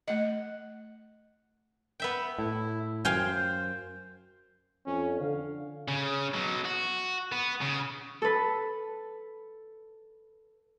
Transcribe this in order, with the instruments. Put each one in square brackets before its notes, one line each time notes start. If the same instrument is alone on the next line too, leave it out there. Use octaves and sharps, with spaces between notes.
[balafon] A3 D#5 [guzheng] F#5
[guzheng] B3 E5 G5
[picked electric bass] A2 [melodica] E4
[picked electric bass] F#2 [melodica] C5 [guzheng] F5 G5 G#5
[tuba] F2 [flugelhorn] C#4
[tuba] D3 [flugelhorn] F5
[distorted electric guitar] C#3
B2 F#3
F#4
B3
C#3
[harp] A4 B4